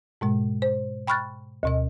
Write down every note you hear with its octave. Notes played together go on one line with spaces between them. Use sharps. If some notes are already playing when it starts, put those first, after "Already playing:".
G#2 B2 G#3
C5
G5 B5 C#6 F6 F#6 A6
D2 B2 D#5